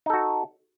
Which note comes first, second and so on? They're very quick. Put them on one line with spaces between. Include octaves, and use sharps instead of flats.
D#4 A4 F#4